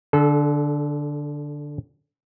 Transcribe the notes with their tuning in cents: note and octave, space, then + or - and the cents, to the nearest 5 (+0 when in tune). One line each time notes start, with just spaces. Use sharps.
D3 +0 A4 -30